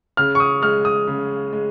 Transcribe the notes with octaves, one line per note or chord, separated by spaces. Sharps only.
C#3 F6
C#6
D#6
G#3 F6
D#6
C#3
G#3